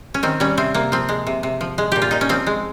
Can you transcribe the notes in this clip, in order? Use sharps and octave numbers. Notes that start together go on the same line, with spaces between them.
C#4
D#3 C4
G3 C#4
C3 C4
C3 A#3
F3 C4
G#3
C3
C3
F3
G#3
A#2 G4
F4
A#2 D#4
C#4
F3 C4
G#3